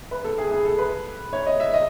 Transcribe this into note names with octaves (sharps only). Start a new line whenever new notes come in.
B4
A4
G#4
G#4
A4
B4
C#5
D#5
E5
D#5